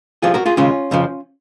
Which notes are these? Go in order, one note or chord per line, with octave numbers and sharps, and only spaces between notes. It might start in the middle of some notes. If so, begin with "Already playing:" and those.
C2 C3 F3 F4 G#4
F#4 A#4
F4 G#4
D#2 C#3 G#3 C#4 F4
F2 C#3 F3